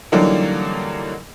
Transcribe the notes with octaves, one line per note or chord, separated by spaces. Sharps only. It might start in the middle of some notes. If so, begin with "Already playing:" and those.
D3 E3 F#3 G3 A#3 D#4